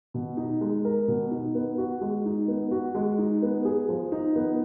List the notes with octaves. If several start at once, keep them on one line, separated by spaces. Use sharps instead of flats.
B2
D#4
G#3
A#4
B2
D#4
B3
F#4
G#3
D#4
B3
F#4
G#3
D#4
B3
G#4
F3
D#4
B3